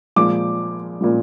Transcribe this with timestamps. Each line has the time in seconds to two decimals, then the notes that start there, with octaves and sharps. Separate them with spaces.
0.16 A#2 F3 G#3 D6
1.01 A#2 F3 G#3